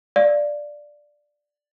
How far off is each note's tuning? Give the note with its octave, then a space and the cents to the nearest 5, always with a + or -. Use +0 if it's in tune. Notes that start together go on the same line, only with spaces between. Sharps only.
D5 +0 F5 +0